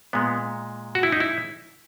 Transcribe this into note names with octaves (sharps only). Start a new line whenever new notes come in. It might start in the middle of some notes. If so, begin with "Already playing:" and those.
A#2 G#3 B3
F#4
E4
D#4
E4